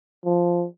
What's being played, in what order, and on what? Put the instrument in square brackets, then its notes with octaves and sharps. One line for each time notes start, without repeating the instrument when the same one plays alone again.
[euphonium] F3